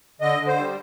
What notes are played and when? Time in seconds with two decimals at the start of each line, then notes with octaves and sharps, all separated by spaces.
0.21 D3 D#5
0.39 D3
0.47 C5
0.56 G3